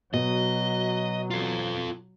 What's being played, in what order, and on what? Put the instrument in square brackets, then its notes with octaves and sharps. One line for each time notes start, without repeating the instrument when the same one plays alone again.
[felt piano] B2 [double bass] F#3 [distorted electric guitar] D#5
[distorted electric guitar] F4 A4